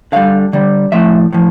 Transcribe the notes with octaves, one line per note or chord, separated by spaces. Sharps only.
D3 G3 F5
D3 G3
A2 F3 A3 E5
A2 F3